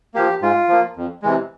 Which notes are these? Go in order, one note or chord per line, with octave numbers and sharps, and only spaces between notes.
F3 A#3 G4
G#2 F4
F3 A#3
F2
C3 E3 G#3